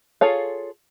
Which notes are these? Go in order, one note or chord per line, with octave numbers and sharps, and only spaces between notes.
F4 G#4 A4 C#5 F5